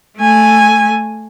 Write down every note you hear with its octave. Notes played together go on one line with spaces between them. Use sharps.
A3 G#5